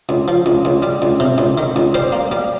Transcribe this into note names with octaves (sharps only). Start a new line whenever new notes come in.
C#2
F3
C#2
C#2
G3
C#2
C3
C#2
D#3
C#2
G3 C5
A#3
G3